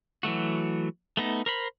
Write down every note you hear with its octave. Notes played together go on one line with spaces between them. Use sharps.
E3 F#3 A3 F#4
A3 B3 D#4
A#4 C5 B5